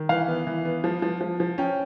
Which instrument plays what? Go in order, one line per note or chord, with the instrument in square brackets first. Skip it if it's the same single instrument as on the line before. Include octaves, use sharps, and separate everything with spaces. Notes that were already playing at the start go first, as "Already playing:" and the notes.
Already playing: [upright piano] D#3
[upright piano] E3 [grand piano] F5
[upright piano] B3
E3
B3
F3
F3
F3
F3
[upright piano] C#4 [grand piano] G5